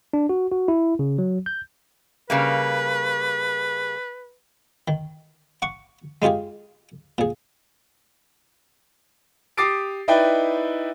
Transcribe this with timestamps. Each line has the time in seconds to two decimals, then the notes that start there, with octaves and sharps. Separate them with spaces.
0.13 D4
0.29 F#4
0.52 F#4
0.68 E4
0.99 C#3
1.18 F#3
1.46 G6
2.30 C#3 G3 A#3 B4
4.88 D#3
5.62 F#5 C#6 D6
6.22 G#3 D#4 F4 G4 G#4
7.18 A#2 G#4
9.57 G4 D6 D#6 A6 C7 D7
10.08 D#4 E4 B4 D5 E5 G5